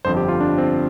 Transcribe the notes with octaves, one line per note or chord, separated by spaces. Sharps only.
G1 F2 D3 F3 C5
G4
F4
D4
C4